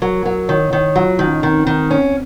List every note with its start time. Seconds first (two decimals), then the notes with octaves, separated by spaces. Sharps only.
0.02 F#3 A#4
0.25 F#3 A#4
0.49 D#3 C#5
0.72 D#3 C#5
0.96 F#3 F4
1.19 D#3 D#4
1.28 C#4
1.35 D#4
1.43 D#3 C4
1.66 D#3 C4
1.91 C#4